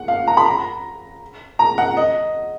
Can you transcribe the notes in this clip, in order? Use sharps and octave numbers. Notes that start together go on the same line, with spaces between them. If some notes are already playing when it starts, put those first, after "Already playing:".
Already playing: F#5
F5
A#5
B5
A#5
A#5
F#5
D#5